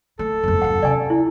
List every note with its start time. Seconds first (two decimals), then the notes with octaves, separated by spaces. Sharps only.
0.19 A3 A4
0.43 F#1 F2
0.62 D#1 F#2 F#5
0.83 C3 C#4 D5 G#5
1.10 E4